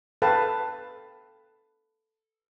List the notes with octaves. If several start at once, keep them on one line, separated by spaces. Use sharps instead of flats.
A4 B4 F5 G5 A5